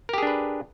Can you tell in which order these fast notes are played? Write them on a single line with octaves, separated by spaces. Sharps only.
A#4 G4 G#4 D4 B4